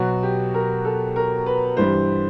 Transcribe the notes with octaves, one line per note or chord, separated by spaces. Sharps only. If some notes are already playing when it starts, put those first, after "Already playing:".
Already playing: B2 F#3 F#4
G4
A#4
A4
A#4
B4
G2 E3 G3 C5